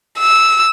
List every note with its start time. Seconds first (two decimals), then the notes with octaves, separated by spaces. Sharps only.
0.20 E6